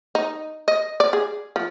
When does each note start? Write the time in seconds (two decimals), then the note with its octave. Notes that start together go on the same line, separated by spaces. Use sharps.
0.15 D#4
0.68 D#5
1.00 D5
1.13 G#4
1.56 F3